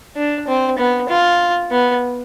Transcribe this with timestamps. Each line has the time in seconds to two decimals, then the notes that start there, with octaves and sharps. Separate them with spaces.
0.16 D4
0.47 C4
0.78 B3
1.09 F4
1.71 B3